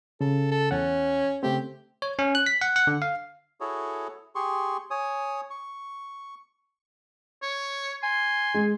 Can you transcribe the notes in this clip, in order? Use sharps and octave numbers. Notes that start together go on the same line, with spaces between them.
C#3 A4
A4
E2 C#4 F#5
C#3 A3 C4 G4
C#5
C#4
F#6
B6
F#5
F#5
D3
F5
E4 F#4 G#4 A4 C#5
G4 G#4 C6 C#6
C#5 G#5 D#6
C#6
C#5
G#5 C6
G#3